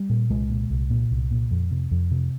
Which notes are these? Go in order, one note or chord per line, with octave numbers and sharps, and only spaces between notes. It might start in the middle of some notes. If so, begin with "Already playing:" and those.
Already playing: G3
A#2
C2 G#3
A#2
C2
A#2
C2
A#2
F2
C3
F2
C3